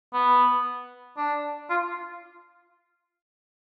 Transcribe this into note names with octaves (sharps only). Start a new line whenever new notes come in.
B3
D4
F4